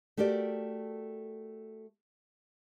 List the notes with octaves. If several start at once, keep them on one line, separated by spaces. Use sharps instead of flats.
A3 F#4 G4 A#4 D5